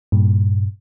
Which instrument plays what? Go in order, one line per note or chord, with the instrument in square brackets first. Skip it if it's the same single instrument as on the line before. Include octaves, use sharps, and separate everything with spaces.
[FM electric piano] G2 A#2